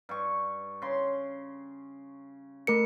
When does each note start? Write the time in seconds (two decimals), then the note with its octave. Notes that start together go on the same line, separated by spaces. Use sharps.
0.09 G2 C#6
0.82 C#3 C6
2.67 A3 A#4 C#7